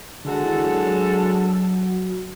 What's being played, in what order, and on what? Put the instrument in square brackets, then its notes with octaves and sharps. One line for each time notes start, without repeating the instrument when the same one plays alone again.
[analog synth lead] D3 [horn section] G#3 D4 F#4 A4
[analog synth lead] E3
F#3
F#3